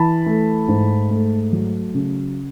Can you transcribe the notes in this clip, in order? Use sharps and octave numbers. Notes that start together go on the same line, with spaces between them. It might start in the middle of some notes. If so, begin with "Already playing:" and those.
Already playing: E3 A5 B5
A3
G#2
A3
F#3
C#3